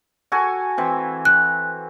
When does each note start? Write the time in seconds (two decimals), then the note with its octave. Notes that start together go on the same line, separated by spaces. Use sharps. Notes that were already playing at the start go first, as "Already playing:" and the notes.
0.32 F#4 A4 G#5
0.78 E3 C4
1.25 F#6